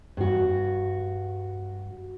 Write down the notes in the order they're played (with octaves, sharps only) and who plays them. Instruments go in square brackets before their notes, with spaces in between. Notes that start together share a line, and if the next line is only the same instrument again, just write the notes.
[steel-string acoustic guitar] G2 F#4